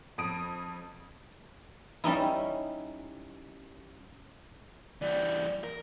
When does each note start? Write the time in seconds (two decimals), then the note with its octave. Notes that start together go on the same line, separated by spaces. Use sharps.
0.18 F2 D#6 D7
2.04 G3 C#4 D#4 E4
5.02 E3 G3 D5
5.64 A#4